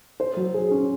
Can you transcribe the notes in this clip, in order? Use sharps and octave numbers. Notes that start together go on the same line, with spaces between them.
C5
F#3
G#4
C#4